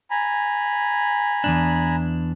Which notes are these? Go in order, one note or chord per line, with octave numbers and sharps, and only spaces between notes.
G#5 A#5 B5
E2 G#2 D4